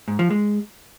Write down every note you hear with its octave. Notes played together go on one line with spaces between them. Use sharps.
G#2
F3
G#3